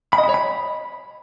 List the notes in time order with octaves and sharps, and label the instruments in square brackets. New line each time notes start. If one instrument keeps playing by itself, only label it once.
[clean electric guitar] B5
D#5
B5
C#5
B5